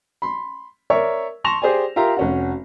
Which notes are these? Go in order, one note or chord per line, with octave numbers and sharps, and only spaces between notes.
B5 C6
A#4 C#5 D5 E5 C#6
A5 C6 C#6 A#6 E7 F7
G4 G#4 C5 D5 G#5
F4 G4 A#4 E5 A#5 C6
F1 C#4 F#4